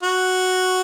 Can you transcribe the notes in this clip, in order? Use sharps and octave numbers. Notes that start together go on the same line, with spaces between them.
F#4